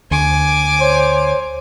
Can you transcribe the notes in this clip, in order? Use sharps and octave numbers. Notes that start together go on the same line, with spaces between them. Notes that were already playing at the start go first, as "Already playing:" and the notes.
D2 G#5 D6
C5 C#5